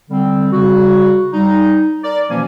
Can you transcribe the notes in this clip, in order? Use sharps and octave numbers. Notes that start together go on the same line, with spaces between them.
D3 G3 C4
C#3 G3 F#4
G3 D#4
A#4 D5
B2 E3 F3 A#3 C#4 G#5